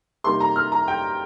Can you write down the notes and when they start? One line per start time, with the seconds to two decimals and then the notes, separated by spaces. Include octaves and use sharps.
0.24 C3 G3 A#3 D#4 C6
0.40 A#5
0.56 F6
0.72 A#5
0.88 G5